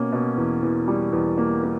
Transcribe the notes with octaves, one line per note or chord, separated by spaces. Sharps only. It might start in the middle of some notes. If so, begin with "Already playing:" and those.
Already playing: B2 A#3 C#4
B2
E2
E2
G3
E2
A#3
A#3